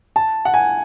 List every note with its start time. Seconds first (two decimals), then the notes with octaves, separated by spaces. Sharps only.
0.16 A5
0.45 F#5
0.54 G#5